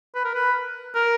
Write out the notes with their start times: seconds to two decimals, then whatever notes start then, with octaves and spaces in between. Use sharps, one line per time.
0.15 B4
0.24 A#4
0.34 B4
0.95 A#4